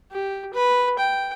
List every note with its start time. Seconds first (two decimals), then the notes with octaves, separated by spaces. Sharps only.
0.12 G4
0.54 B4
0.99 G5